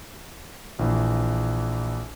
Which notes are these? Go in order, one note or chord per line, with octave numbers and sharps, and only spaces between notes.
A#1 E3